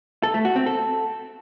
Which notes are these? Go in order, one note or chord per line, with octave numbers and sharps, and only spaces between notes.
A4
A3
F#4
C4
A4